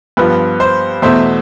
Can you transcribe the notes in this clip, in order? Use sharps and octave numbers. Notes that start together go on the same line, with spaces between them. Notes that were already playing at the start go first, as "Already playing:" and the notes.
G2 F3 B3 B4
C5
E2 B2 A3 C5 E5